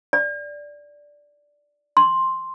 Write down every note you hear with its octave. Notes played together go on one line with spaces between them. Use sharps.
D5
C6